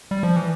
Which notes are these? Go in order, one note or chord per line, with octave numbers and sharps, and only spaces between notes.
G3
F3
E3